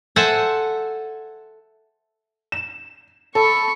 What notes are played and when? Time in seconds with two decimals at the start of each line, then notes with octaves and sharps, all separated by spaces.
0.16 A4 C5 E5 F#5 G#5
2.52 E7
3.35 A4 B5 C#6